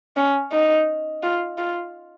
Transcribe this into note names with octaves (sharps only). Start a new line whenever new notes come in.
C#4
D#4
F4
F4